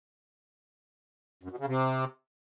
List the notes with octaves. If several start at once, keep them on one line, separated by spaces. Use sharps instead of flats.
F#2
B2
C#3
C3